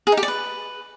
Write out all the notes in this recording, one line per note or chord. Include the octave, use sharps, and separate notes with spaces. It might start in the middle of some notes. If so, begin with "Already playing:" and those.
G#4
D#4
G4
D5
B4